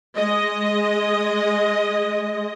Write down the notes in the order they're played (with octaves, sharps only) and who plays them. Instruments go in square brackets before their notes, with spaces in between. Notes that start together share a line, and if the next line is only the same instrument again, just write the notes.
[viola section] G#3 D#5